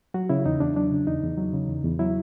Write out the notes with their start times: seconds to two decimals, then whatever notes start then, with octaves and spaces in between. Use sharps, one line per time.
0.14 F#3 F#4
0.29 C#3 E4
0.46 E2 D#4
0.60 E2 D4
0.76 F#3 D4
0.91 C#3
1.07 E2 D#4
1.23 E2
1.37 F#3
1.53 C#3
1.69 E2
1.84 E2
1.99 F#3 E4